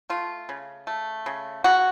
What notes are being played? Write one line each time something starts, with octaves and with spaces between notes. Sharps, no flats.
A3 F4
C#3
A3
C#3
C#3 F#4